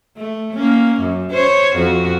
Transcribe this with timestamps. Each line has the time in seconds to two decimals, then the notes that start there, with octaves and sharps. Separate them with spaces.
0.17 A3
0.54 A#3 C#4
1.01 F#2
1.31 C5 C#5
1.75 F2 F#4